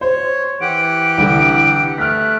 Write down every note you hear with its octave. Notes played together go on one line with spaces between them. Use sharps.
C5 C#5
E3 G4 F#5 D7
C2 D3
A3 F6 F#6 B6